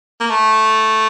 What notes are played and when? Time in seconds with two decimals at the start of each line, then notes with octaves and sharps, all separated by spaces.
0.20 A#3
0.30 A3